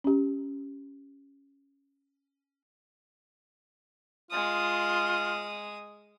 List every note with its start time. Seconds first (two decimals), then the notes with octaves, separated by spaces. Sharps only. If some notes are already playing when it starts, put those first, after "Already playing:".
0.04 C#4 G4
4.31 G#3 F4 D#6